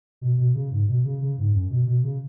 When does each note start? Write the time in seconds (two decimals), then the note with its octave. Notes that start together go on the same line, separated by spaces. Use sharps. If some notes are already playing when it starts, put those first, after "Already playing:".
0.21 B2
0.37 B2
0.54 C#3
0.71 G#2
0.88 B2
1.04 C#3
1.21 C#3
1.38 G#2
1.53 F#2
1.70 B2
1.87 B2
2.03 C#3